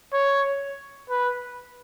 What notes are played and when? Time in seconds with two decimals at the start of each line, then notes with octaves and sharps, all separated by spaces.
0.13 C#5
1.10 B4